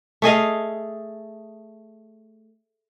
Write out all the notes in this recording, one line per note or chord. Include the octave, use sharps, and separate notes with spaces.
A3 G#4 D#5 F5